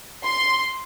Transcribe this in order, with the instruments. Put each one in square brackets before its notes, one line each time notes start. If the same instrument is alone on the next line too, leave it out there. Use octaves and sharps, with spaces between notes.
[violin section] C6